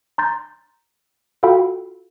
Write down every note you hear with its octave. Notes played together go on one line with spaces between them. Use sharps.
A#5 C6 G6 A6
F4 F#4 A4 F5 G5 B5